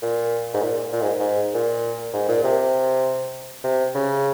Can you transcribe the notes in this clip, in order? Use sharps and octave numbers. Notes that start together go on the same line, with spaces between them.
A#2
G#2
A#2
A#2
G#2
G#2
A#2
G#2
A#2
C3
C3
C#3